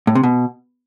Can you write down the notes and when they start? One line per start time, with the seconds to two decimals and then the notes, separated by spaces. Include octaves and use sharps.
0.07 A2
0.15 C3
0.23 B2